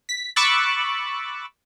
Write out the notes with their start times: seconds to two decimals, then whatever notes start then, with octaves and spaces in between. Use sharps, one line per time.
0.09 B6
0.36 B5 C#6 D6 E6 F#6 A6